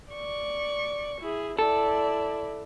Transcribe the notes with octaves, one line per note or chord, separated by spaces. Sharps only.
D5 C#6
E4 G#4
E4 A4 D5